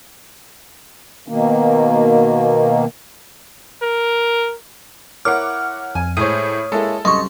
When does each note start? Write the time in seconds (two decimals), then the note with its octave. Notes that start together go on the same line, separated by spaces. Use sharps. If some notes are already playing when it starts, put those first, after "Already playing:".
1.28 B2 D#3 A#3
3.82 A#4
5.25 E4 A#4 C#5 F#5 D6 F6
5.95 F2 G#5
6.17 A2 G#3 C5 C#5 D#6
6.72 G#3 A#3 E4 A4
7.05 C2 F#2 D#5 C6 C#6